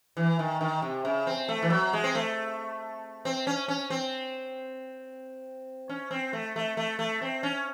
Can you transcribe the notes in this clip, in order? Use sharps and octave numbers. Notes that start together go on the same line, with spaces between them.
E3
D#3
D#3
C3
C#3
C4
A3
E3
F#3
G#3
C4
A3
C4
C#4
C#4
C4
C#4
C4
A3
A3
A3
A3
C4
C#4